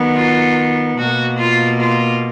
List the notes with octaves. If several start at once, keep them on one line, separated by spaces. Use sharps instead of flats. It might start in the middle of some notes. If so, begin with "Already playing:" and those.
Already playing: D#3 F#3 B3
F4
B2 A#3 F#4
F4
F4